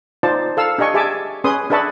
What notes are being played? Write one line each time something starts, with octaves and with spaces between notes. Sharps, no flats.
D#4 F4 C5 D5 A5
A4 F5 E6
D4 G4 D#5 G#5 C#6
G4 G#4 E5 G#5 A5 D6
C#4 G#4 B4 C6 D#6
D4 G#4 B4 E5 A5 C#6